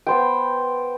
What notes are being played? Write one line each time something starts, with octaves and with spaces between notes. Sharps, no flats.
B3 C5 G5